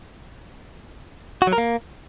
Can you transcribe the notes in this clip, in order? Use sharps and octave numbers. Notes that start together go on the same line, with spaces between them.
F#4
F#3
A#4
A#3